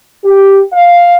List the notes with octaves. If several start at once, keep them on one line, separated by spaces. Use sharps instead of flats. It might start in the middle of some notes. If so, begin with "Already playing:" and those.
G4
F5